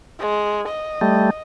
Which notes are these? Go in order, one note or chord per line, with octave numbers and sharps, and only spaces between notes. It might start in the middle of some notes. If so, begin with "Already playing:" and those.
G#3
D#5
G3 A3